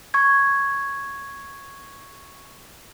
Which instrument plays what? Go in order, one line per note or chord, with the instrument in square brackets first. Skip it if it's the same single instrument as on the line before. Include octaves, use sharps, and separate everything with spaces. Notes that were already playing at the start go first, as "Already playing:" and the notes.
[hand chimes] C#6 G#6